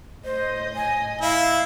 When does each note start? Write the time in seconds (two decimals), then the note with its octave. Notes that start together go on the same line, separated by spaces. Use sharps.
0.25 A2 C5 D#5
0.76 G#5
1.21 E4 F5